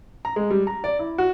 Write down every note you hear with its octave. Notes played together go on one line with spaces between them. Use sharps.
A#5
G#3
G3
A#5
D5
E4
F#4